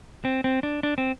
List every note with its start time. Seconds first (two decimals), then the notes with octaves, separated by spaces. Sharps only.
0.25 C4
0.44 C4
0.63 D4
0.83 D4
0.98 C4